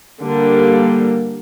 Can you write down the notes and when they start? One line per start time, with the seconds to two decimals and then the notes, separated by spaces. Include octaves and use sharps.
0.22 D3 G3 A#3